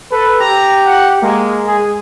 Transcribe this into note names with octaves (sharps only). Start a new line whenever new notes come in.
A4 B4
G4 A#5
F#5
G#3 A#3
G#4